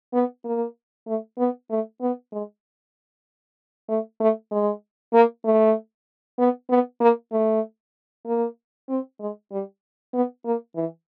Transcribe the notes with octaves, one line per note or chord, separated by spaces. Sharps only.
B3
A#3
A3
B3
A3
B3
G#3
A3
A3
G#3
A#3
A3
B3
B3
A#3
A3
A#3
C4
G#3
G3
B3
A#3
E3